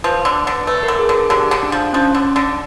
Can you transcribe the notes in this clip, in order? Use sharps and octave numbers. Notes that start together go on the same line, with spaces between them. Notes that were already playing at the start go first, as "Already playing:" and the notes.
F3 B4
D3
D3
A3 B4
A#4
D3
G#4
D3
G#4
D3 G4
D3
D4
F3
F3 C#4
D3
D3